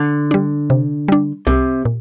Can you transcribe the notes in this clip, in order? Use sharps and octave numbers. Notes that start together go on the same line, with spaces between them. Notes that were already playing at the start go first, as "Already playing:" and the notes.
Already playing: D3
G3 D4
C3
G3 D4
C2 C3
A#2